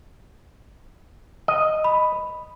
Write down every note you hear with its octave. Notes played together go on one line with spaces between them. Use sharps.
D#5
B5